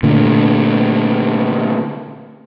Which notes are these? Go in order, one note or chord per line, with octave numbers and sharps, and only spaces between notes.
A#2 D3 A3